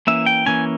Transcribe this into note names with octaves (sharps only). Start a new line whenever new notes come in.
E3 A#3 C#4 E5
G5
E3 A#3 C#4 G#5